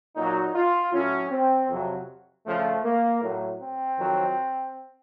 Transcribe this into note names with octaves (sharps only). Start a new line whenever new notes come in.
A#2 F#3 D#4
F4
A2 F#3 C#4
C4
F2 C3 F#3
F2 C#3 F3 A3
A#3
A2 F#3
C4
F2 D#3 F#3